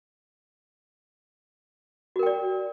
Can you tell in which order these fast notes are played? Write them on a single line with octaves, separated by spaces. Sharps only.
F#4 A#4 G5 D5